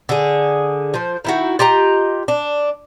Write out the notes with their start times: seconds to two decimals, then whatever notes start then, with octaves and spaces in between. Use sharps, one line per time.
0.09 D3 G#4
0.94 F3 C5
1.25 D#3 E4 F#4
1.59 F4 G4 D#5 A#5
2.28 D4